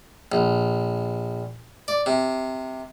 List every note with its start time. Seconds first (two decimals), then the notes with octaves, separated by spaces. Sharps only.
0.32 A#1
1.88 D5
2.06 C3